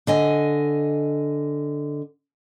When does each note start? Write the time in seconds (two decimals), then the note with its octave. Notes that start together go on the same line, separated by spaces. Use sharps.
0.07 D3 D#5 G#5